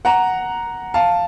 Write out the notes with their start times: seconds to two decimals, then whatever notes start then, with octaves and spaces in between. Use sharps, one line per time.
0.05 F#5 A#5
0.94 F5 A5